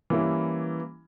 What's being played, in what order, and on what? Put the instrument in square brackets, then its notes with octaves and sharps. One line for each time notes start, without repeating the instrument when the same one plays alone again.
[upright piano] E3 G3 A#3 C#4 E4